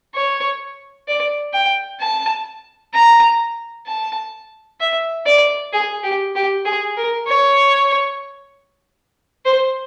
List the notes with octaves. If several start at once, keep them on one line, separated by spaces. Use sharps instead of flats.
C#5
D5
G5
A5
A#5
A5
E5
D5
G#4
G4
G4
G#4
A#4
C#5
C5